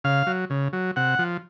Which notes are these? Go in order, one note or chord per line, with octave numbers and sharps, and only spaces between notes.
C#3 F5
F#3
C#3
F#3
C3 F#5
F3